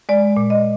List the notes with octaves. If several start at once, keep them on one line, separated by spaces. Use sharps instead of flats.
G#3 D5
A#2
D#5